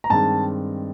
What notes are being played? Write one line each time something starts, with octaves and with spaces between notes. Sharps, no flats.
A#5
G2 D#3 G#3 C4 A5